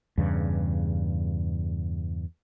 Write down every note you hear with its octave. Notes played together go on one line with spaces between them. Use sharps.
E2 G2 C#3